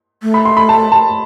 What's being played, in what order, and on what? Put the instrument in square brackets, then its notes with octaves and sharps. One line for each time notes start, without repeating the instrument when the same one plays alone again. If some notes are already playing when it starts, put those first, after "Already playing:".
[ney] A3
[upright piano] B5
C6
B5
A5
A5